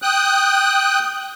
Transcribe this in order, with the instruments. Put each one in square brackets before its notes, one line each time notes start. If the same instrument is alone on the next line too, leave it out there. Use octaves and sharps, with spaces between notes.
[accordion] G5 D#6 F#6